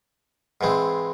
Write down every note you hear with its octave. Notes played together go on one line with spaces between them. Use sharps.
G#2 E3 G#3 C4